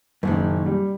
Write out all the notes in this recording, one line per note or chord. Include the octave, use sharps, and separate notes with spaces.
F#1 F#2 A#2 D#3
G3